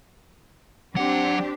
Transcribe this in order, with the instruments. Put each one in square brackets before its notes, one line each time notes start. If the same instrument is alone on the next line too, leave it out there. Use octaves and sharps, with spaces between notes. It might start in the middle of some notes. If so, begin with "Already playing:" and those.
[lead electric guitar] F#3 F#5 [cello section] C4 D4 G4